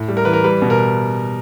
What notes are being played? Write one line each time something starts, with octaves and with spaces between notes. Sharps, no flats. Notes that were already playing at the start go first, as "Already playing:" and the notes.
Already playing: A2
G3
A#4
E3 B4
A#4
G3 B4
B2
A#4